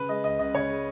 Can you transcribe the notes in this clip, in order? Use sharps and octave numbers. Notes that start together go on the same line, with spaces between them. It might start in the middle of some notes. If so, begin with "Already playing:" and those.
Already playing: C#3 B4
G#3 D#5
C#2 D#5
C#2 D#5
C#3 C#5
G#3